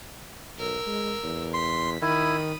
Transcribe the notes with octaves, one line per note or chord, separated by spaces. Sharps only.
B1 A#4 E6
G#3
E2
C6 B6
D#3 E4 B5 D#6